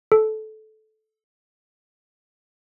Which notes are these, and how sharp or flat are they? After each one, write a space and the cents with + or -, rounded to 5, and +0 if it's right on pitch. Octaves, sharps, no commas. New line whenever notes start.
A4 -15